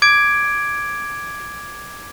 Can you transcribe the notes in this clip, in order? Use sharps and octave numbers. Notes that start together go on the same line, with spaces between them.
D6 G#6 D7